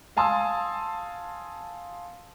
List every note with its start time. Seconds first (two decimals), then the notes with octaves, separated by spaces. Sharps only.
0.17 F5 G#5 A5 C6 D#6 E6